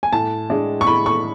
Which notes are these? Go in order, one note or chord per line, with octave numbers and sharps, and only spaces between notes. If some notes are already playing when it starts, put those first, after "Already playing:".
G#5
A2 A5
G#3 D4
C#6
A2 B5
C#6